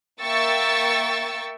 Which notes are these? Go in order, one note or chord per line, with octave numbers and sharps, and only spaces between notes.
A#3 E5 G5 C#6 E6 A6